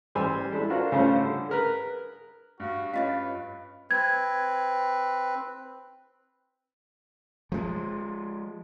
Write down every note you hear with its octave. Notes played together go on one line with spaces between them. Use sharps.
A1 G3 C5 G#5 C6 E6
G#3 D4 E4 A4
D4 F4 F#4 A#4 C5
C#3 G3 A3 C#4 F4 C5
D3
G#4 A#4 B4
G2 F#4
C#4 F4 B4 C#5 D#5 F5
C4 B4 G#6
F3 G#3